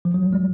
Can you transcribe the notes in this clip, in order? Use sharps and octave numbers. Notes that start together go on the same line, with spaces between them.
F3
F#3
G3
G#3